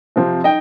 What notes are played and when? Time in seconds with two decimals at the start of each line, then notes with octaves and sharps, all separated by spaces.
0.16 C3 F3 C4
0.44 D#4 D#5 G5